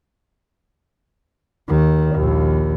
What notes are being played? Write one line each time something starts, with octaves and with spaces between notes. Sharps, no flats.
D#2 D#3
A#1 D#2